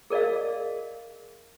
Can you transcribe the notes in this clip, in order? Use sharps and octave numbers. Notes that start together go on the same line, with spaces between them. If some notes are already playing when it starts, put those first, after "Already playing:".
G#4 A#4 D5 D#5 F5